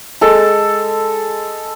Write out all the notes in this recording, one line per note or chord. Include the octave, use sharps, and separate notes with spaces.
G#3 A4